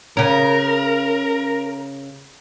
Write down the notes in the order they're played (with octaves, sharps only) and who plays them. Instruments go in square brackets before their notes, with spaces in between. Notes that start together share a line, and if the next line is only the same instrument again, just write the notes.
[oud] C#3 C#4 [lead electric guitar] A#4